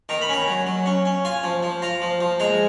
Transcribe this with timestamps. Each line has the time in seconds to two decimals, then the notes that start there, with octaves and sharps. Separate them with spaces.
0.09 D#3 A#5
0.21 B5
0.29 C#4 A#5
0.48 F#3
0.67 F#3
0.86 C#4
1.05 C#4
1.25 F4 G#5
1.44 F3
1.63 F3
1.82 F4 A#5
2.02 F3
2.21 F3
2.40 G#3 A#5